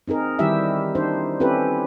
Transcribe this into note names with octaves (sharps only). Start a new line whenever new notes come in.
C4 D#4 G#4 A#4
D#3 E3 G3 E4 G4 E5
D4 D#4 C5
C4 C#4 E4 G4 A4 B4